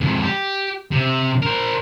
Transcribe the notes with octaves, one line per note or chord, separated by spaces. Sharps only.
F2 G#2
G4
C3
A#4 C5